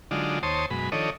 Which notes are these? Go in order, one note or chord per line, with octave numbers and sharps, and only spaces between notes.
D3 F#3 G#3 D4 D#4 F4
D#2 C5 C#5 A5 C6 D#6
F#2 B2 G#3 B5
D#3 F3 D4 A4 C#5 D#5